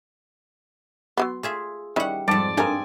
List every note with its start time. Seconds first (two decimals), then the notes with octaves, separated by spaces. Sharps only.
1.17 F#3 G#3 B3 C6
1.43 A3 F4 G#4 E5
1.96 D#3 G3 C#4 E4 F#5
2.28 F2 G#2 G3 D5 A5
2.57 G2 C4 D4 A4 A#4 D#5 G#5